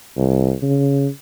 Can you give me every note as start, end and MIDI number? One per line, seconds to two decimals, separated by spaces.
0.16 0.53 36
0.62 1.07 49